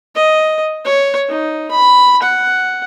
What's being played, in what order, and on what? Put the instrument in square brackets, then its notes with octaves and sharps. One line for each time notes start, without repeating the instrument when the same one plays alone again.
[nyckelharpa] D#5
C#5
D#4
B5
F#5